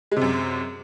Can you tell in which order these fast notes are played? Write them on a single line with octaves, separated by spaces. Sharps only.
G#3 C3 F#2